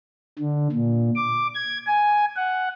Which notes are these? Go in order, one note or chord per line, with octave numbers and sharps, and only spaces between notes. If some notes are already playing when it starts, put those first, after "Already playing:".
D3
A#2
D6
G#6
G#5
F#5